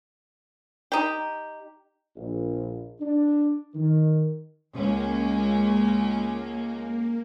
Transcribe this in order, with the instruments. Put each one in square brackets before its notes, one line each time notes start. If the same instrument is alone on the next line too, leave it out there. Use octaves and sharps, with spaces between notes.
[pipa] D#4 G4
[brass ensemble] A#1
D4
D#3
[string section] C#2 C#4 [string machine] A#3